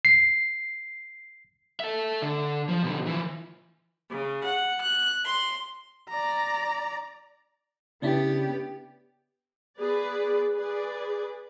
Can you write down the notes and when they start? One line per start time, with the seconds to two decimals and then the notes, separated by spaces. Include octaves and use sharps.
0.05 C7
1.80 A4 E5
2.22 D3
2.69 F3
2.83 B2 D3
3.06 E3 F3
4.09 C#3
4.45 F#5
4.82 F#6
5.24 C6
6.09 D5 A#5
8.02 C#3 B3 C#4 D4 E4 G4
9.79 B3 G#4 B4 D5
10.54 G#4 B4 D5